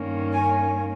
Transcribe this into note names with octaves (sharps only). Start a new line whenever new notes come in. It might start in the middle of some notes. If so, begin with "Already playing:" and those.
Already playing: G2 D#3 A#3 C#4
G#5